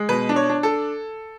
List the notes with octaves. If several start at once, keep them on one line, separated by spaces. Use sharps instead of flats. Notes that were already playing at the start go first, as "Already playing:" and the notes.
Already playing: G#3
B2 B4
D4
C#5
D4
A4